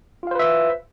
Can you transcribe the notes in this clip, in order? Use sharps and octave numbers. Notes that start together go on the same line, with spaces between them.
F4 B4 C5 E5 F5